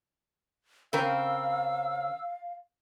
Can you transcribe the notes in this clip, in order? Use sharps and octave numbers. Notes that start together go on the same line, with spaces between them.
C#3 C4 A#4 F5 E6